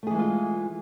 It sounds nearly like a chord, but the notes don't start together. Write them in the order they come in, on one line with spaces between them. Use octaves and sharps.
A3 G#4 E3 G#3 F4